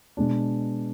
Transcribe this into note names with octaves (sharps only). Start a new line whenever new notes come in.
B2 G#3 D4